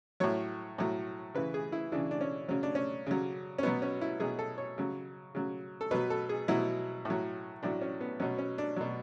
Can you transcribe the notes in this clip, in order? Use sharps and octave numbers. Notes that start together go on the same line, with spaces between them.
A2 F#3 C#5
A2 F#3
C#3 E3 B4
G#4
E4
C#3 E3 D4
D4
C#4
C#3 F#3 C#4
D4
C#4
C#3 F#3
C#4
B2 F#3 B3
C#4
E4
B2 F#3 G#4
A4
C#5
C#3 F#3
C#3 F#3
A4
B2 F#3 B4
A4
G#4
B2 F#3 E4
A2 F#3
A2 F#3 D4
C#4
B3
B2 F#3 C#4
C#4
D4
B2 F#3